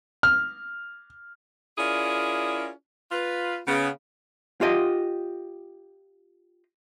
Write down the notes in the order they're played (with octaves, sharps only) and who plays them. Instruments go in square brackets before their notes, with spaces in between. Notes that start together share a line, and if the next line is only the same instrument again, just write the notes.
[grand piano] F6
[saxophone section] C#4 E4 F4 G#4 A#4 D5
F4 B4
C#3 B3
[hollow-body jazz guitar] F4 G4 D#5